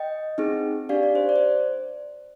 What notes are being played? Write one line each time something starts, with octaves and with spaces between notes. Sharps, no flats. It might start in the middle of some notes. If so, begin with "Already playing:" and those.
Already playing: D#5 G5
C4 D#4 G#4
D4 G4 D5 F5
D5
C5
D5
C5